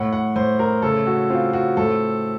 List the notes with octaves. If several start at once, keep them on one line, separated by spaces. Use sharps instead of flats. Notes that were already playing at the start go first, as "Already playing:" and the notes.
Already playing: A2 F#5
F#5
A2 C5
A#4
C#3 A4
F#4
C4 F4
F#4
A2 A4